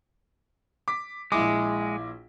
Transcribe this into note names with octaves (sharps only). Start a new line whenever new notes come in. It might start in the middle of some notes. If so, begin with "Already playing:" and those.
D6 B6
A#1 G#3 E4 D6